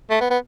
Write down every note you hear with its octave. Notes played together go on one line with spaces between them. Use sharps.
A3
B3
B3